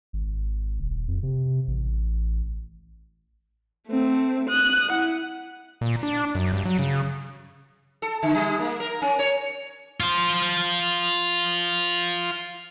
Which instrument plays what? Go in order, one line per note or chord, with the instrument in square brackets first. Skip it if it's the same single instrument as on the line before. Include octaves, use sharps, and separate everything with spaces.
[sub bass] G#1
D#1
F2
C3
A1
[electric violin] A3 C4
D#6 F#6
E4 F#5
[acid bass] A#2
D4
F#2
G2
F#3
C#3
[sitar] A4
D3
G3
A#3
A#4
C#4
C#5
[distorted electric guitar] F4 C5